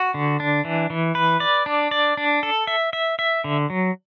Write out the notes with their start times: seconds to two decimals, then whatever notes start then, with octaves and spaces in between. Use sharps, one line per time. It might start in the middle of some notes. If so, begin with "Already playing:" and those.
Already playing: F#4
0.14 D3
0.40 D4
0.65 E3
0.90 E3
1.15 B4
1.40 D5
1.66 D4
1.91 D5
2.17 D4
2.43 A4
2.67 E5
2.93 E5
3.19 E5
3.44 D3
3.70 F#3